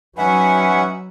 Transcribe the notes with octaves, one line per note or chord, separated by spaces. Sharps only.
F#3 C#4 D#4 B4 E5 F#5 G#5